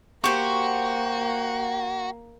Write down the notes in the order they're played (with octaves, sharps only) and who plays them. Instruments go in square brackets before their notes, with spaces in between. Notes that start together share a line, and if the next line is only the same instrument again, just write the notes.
[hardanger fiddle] A#3 [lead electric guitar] F#4 [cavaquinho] G4 C5 [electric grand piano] C#6